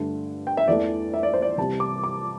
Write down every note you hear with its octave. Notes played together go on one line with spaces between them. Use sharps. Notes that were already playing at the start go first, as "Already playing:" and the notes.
Already playing: G2 D3 A3
G5
E5
E2 E3 A3 D5
E5
D5
C5
D5
C2 C3 G3 A5
D6
D6